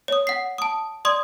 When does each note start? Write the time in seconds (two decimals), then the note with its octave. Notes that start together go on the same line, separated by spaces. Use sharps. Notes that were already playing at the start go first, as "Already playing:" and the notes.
0.08 C#5 D#6
0.27 F#5 C7
0.58 A5 D#6
1.05 D5 C6 D#6 G#6